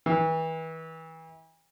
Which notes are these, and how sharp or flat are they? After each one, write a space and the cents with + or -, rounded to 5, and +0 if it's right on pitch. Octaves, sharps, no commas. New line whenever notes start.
E3 -30